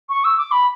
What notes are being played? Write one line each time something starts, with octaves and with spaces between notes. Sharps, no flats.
C#6
E6
D6
B5